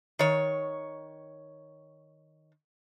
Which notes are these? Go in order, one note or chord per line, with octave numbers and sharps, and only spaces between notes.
D#3 C#5